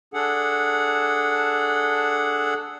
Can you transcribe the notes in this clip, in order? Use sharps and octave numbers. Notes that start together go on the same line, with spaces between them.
D4 G#4 A4 F#5